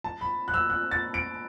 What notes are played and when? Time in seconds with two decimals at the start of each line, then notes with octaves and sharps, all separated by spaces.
0.04 A5
0.21 B5
0.48 F#6
0.54 E6
0.70 F#6
0.91 A6
1.14 D7